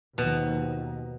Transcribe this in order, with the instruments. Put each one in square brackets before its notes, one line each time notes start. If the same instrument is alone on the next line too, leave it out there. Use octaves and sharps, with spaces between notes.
[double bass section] D#2 D#3 F3 [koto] B2